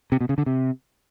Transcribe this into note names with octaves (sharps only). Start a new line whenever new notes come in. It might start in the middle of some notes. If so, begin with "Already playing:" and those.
C3
B2
C#3
D3
C3